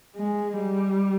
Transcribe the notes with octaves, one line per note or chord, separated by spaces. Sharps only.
G#3
G3